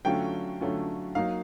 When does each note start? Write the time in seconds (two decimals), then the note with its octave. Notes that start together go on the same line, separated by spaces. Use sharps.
0.05 D3 F#3 A3 C#4 F4 G5
0.60 D3 F#3 A3 C#4 F4
1.15 F#3 A#3 D#4 F5